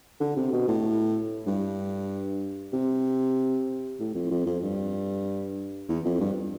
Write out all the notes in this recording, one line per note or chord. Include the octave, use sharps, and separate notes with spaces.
D3
C3
B2
A2
G2
C3
A2
F2
F2
F2
G2
E2
F2
G2